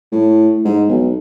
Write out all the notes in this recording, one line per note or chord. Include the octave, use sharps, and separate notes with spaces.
A2
G#2
B1